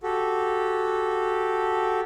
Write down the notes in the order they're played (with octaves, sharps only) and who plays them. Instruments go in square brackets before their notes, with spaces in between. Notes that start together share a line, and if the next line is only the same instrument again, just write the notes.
[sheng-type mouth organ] F#4 G4 A4